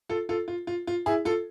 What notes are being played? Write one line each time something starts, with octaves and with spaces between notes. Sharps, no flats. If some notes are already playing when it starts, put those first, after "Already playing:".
F4 A4
F4 A4
F4
F4
F4
E4 G#4
F4 A4